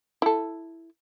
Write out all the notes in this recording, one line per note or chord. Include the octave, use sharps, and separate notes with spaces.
E4 A4